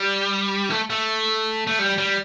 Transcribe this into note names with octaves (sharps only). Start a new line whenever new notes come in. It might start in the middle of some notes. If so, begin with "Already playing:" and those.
Already playing: G3
A3
A3
A3
G3
G3